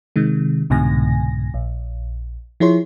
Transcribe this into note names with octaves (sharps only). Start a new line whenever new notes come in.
C3 D#3 G#3
C2 G#2 B2 D3 G#5 A#6
A#1
F3 E4 G#4 C#5 C6